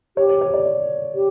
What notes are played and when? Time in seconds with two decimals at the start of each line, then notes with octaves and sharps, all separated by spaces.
0.17 G4 C#5
0.29 C#5
0.41 C#5
0.54 D5
1.15 G4